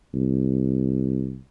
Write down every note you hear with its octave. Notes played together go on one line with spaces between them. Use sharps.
C2